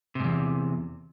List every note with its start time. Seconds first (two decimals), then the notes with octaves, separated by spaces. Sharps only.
0.15 C3
0.20 G#2
0.24 E2